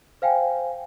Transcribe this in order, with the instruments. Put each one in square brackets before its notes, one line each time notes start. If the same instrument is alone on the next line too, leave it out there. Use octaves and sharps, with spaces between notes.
[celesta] C5 F5 G5 G#5